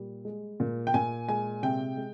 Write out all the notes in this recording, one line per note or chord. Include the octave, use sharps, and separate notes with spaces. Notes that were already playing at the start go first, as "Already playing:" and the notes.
Already playing: A#2 G3
G#3
A#2
G5
A#2 G#5
G#3 G#5
C3 G5
G#3